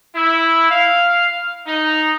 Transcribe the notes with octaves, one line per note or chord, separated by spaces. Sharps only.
E4
F5
D#4